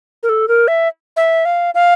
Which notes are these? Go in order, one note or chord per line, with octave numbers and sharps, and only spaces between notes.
A#4
A4
A#4
E5
E5
F5
F5